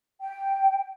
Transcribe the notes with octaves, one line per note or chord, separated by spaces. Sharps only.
G5